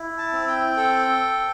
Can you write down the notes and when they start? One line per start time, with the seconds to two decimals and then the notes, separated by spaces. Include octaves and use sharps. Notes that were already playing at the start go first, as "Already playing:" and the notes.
Already playing: E4
0.18 A5
0.33 C4
0.48 G5
0.77 A4